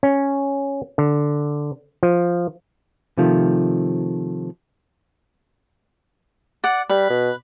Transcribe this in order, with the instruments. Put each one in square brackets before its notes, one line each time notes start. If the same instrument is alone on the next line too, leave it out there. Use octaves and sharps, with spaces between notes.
[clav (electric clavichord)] C#4
D3
F3
[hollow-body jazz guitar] C3 D#3 F3 A3
[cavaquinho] D5 F#5
[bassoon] G3 [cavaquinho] B4
[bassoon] B2